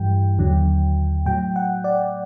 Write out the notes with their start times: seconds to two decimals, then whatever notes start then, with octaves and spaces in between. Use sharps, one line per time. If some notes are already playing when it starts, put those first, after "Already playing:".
Already playing: G2 E3 G3 G5
0.38 D#2 D3 F#3
1.25 A2 F#3 G5
1.56 F#5
1.84 D5